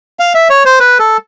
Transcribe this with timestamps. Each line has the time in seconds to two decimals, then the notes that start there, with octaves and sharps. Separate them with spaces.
0.19 F5
0.35 E5
0.50 C#5
0.65 C5
0.80 B4
0.99 A4